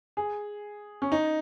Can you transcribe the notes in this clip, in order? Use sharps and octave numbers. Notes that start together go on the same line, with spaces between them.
G#4
C#4
D#4